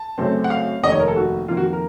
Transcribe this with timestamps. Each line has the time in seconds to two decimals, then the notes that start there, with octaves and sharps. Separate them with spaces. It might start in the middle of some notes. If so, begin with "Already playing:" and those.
Already playing: A5
0.18 F#2 C#3 A3 C4
0.44 F#5
0.50 F5
0.83 F1 D#2 D#3 A#3 D#5
0.92 C#5
1.00 A#4
1.08 A4
1.16 F#4
1.48 F2 D#3 A#3 F4
1.57 F#4
1.73 A#4